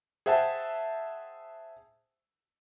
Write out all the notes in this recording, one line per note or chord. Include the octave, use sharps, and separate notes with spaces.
G#4 C5 E5 F#5 G5 A5